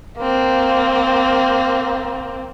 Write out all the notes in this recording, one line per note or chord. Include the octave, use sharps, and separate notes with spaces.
A#3 C4